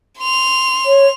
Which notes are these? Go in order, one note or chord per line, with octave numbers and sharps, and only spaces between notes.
C6 F7
C#5